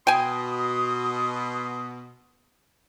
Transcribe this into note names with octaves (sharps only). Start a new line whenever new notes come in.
B2 G5 G#5 C6 D#6